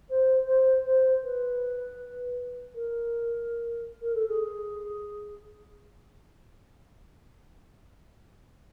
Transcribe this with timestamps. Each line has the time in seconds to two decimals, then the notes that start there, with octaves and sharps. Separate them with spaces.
0.09 C5
0.46 C5
0.84 C5
1.23 B4
2.74 A#4
4.01 A#4
4.14 A4
4.27 G#4